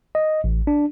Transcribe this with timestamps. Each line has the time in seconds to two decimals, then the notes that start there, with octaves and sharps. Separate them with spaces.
0.15 D#5
0.44 A1
0.67 D4